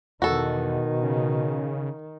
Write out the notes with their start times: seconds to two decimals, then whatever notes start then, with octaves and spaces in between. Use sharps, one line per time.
0.22 E2 B2 D#3 F#4 A4
1.03 C#3